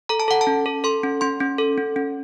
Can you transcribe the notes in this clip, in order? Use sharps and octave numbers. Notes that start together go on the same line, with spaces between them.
A4 A#5
A5
A4 F#5
A5
C#4
A4
A4 C6
C#4
C#4 C6
C#4
A4
C#4
C#4